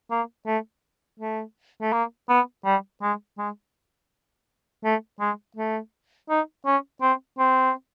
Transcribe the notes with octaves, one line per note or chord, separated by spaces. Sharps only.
A#3
A3
A3
A3
A#3
B3
G3
G#3
G#3
A3
G#3
A3
D#4
C#4
C4
C4